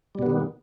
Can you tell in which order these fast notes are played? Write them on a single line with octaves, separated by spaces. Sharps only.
G3 B2 B3 D#3